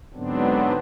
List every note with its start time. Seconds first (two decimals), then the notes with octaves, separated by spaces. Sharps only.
0.14 G#2 D3 F#3 B3 C4 D4